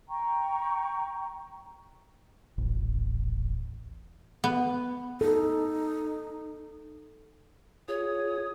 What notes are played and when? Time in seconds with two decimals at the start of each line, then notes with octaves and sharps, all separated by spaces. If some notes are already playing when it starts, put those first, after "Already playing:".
0.09 G5 A#5 C#6
2.58 D#1 A1
4.44 B3
5.21 D#4 A4
7.88 F4 G#4 C#5 D#6